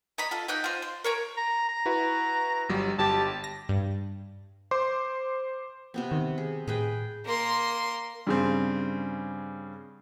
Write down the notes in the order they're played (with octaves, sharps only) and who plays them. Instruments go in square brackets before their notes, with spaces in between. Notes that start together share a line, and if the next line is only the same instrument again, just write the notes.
[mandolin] D#5 A#5 B5
F4 A4
D#4 D#5 G5 F#6
F4 C5
C6
A#4 C#5 A#5
[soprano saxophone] A#5
A#5
[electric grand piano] E4 F#4 B4
G1 F#3 G3
[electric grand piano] G1 G4 A6 [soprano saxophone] A5
[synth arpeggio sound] A#6
G2
[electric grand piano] C5 C6 D6
[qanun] C3 B3 C4
[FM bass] D#3
[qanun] G#4
[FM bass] A2 [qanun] G#4 B4 G5
[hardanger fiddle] A#3 C6
[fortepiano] G2 C#3 C4